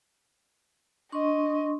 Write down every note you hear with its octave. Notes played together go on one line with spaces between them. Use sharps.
D4 D#5 C6 C#6